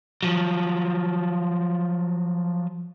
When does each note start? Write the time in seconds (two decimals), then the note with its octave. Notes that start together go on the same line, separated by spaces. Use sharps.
0.23 F3 F#3